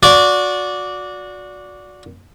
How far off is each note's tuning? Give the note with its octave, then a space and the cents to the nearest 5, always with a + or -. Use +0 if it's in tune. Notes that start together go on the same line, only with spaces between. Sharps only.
F#4 -25 D5 -15